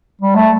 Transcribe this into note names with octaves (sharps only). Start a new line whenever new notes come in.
G3
A3